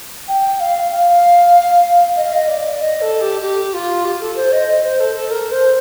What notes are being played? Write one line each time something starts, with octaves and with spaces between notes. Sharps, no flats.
G5
F5
F5
D#5
F5
D#5
D5
D#5
A4
G4
G4
F4
G4
A4
C5
D#5
D#5
C5
A4
A4
A#4
C5